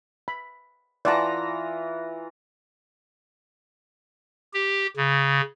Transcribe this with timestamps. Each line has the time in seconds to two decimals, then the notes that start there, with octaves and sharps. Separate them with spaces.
0.28 B5
1.05 E3 F4 D5 F#5 A5 A#5
4.54 G4
4.97 C#3